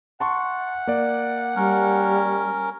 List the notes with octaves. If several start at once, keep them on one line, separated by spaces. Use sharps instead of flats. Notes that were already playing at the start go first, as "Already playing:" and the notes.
F#5 A5 C6 C#6
A#3 D5
G3 C#4 A#4